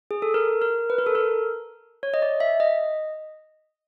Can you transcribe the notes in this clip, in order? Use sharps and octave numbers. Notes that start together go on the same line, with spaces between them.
G#4
A4
A#4
A#4
B4
A#4
A4
A#4
C#5
D#5
D5
E5
D#5